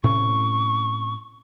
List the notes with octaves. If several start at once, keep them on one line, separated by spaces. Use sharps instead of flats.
A2 C3 C#4 C#6